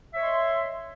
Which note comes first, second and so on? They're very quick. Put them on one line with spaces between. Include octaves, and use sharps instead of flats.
E5 C#5 D#5 C6